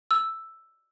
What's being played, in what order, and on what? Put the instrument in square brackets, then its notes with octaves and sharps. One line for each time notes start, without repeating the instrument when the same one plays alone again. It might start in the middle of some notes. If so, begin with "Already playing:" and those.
[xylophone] E6